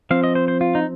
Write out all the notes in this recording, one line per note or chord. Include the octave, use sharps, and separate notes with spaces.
F3 C4 F5
D#5
C5
C5
F4
D#4